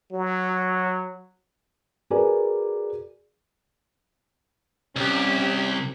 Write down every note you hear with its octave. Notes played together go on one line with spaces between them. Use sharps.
F#3
F#4 G#4 A#4 B4 D5 G#5
C2 C#4 G4